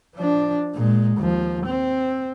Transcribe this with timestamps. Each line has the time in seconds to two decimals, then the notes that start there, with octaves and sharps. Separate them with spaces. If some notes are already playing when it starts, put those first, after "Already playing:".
0.15 F3 D4
0.74 A#2 G#3
1.18 D#2 F3
1.66 C4